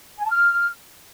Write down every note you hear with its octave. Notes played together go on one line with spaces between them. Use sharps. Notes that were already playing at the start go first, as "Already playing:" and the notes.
G#5
A5
F6